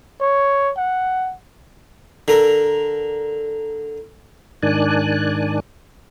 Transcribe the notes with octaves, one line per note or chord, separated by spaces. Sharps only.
C#5
F#5
D3 A#4
G#2 D#3 D4 D5 G#5 F#6